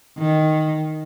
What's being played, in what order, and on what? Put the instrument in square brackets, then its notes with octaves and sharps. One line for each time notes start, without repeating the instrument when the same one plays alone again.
[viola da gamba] D#3